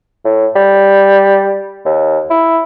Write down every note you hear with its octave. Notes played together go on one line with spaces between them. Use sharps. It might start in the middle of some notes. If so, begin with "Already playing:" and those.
A2
G3
D#2
E4